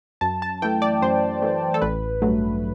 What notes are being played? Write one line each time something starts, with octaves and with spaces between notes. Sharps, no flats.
F#2 A5
A5
E3 A3 G5
D5
F#2 C5
E3 A3
A4
A1 B4
G2 F#3 A3